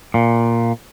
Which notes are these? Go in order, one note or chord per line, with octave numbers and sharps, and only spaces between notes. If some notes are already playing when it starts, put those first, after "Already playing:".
A#2